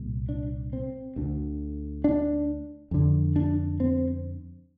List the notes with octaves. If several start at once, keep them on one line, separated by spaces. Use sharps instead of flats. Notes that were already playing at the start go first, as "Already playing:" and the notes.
Already playing: C2 A#2
D4
C4
D2 D3
D4
F2 D3
D4
C4